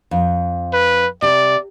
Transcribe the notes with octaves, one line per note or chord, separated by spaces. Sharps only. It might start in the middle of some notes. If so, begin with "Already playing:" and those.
F2
B4
C3 D5